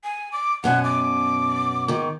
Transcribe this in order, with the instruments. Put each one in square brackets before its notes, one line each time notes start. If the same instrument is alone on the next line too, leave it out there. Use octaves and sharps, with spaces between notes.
[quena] G#5
D6
[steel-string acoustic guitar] F#2 B2 G#5 [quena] F#5
[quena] D6
[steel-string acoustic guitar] G#2 D#3